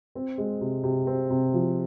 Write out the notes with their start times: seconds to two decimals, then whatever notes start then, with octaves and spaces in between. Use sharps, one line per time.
0.15 C4
0.38 G#3
0.61 C3
0.83 C3
1.07 C4
1.30 C3
1.54 F3